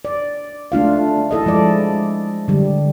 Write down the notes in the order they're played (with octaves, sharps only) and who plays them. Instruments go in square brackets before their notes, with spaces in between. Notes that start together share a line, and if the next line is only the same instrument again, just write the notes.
[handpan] D5
A3 D4 F4 F5
E4 A4 D#5
F3 G#3 D5
D3 G3